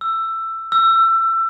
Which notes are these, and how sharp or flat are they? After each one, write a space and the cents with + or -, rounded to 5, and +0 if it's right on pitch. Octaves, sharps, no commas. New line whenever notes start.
E6 +15
E6 +25